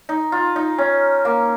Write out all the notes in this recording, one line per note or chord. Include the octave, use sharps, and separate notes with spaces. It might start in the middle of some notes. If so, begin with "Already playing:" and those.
D#4
F4
D#4
C#4
A#3